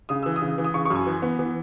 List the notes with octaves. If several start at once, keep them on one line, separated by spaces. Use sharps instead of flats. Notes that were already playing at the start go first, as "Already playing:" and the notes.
C#3 D#6
E3 E6
D#6
C#3
E3
D#6
C#3 C#6
C#6
F#2
G#5
E3
B3
E3